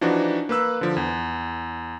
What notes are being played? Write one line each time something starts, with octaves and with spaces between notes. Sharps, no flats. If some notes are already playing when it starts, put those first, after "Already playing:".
E3 F3 D4 D#4 F#4
A#3 B4 E6 F#6
D3 F3
E2